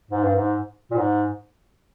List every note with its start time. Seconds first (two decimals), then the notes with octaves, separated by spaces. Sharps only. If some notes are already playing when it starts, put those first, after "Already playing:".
0.11 G#2
0.23 G2
0.36 G#2
0.91 A#2
0.98 G#2